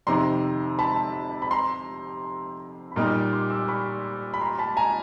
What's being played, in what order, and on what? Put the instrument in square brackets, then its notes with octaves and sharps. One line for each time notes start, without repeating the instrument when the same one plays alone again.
[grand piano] F2 C3 D#3 [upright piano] A#5 C6
[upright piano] A5 B5
B5
A#5 C6
B5
[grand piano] A#2 G3 A#3 D#4 [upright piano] A#5 C6
[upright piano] C6 D6
D6 E6
B5 C#6
B5
A#5 C6
A5 B5
G#5 A#5